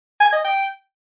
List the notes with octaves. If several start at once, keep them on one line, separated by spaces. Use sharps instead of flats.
G#5
D#5
G5